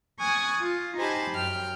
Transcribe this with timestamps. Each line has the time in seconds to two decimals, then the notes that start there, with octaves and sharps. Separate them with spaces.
0.21 G#5 C#6 D#6 F#6 G#6 A6
0.61 F4
0.97 D#4 G4 C5 G#5 A5 B5
1.32 F#2 G5 F6